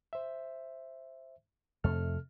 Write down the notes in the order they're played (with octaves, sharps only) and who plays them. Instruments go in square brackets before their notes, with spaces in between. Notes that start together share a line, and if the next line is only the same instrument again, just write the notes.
[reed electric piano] C5 E5
[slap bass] F2 A3 [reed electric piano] C3 A4 F6